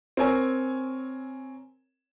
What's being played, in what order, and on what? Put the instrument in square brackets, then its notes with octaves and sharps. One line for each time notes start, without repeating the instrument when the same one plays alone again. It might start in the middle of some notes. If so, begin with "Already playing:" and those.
[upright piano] C4 A#4 C#5 G#5